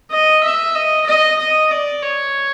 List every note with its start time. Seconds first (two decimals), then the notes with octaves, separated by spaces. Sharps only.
0.11 D#5
0.43 E5
0.75 D#5
1.07 D#5
1.39 D#5
1.71 D5
2.02 C#5